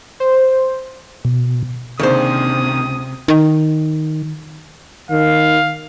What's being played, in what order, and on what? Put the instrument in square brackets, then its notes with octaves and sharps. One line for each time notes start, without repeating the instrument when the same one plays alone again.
[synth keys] C5
[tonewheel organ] B2
[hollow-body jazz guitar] C#2 C5 [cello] C3 [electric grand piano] D#3 A#3 D4 [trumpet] D#6
[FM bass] D#3
[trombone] D#3 [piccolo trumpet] F5